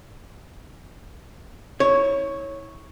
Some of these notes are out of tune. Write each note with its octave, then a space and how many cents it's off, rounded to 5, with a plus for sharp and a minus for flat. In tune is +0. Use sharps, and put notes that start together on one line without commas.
E4 -40 C#5 -5